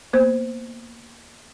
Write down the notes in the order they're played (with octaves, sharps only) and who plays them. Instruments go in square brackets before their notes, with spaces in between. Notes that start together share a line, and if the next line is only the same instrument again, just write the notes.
[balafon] A#3 B3 C5